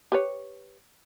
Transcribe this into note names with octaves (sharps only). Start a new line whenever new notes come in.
G4 B4 C#5